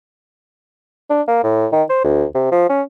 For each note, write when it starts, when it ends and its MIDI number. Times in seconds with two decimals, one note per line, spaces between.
1.10 1.22 62
1.28 1.43 58
1.44 1.66 45
1.72 1.83 51
1.89 2.00 72
2.04 2.25 38
2.35 2.48 48
2.52 2.67 53
2.69 2.82 61